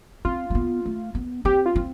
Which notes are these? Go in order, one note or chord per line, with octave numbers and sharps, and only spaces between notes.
C4 F4
A3
B3
A3
B3
C4 G4
F4
C4